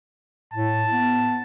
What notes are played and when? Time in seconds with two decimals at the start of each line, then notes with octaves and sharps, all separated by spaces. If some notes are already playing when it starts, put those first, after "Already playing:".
0.54 A2 A5
0.92 B3